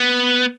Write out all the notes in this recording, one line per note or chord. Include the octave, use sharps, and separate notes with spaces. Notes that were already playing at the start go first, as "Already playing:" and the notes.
Already playing: B3